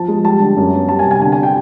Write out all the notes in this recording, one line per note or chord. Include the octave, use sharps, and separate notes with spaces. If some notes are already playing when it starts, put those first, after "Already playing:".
Already playing: F3 A5
G#3
G3 A5
D3
F#2
B3
G3 A5
G#5
C3
G#5
D3 G#5
G#5
G5